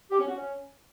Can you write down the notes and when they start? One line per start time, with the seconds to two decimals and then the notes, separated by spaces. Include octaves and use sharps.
0.10 G4
0.19 C#4
0.28 F#4
0.36 C#4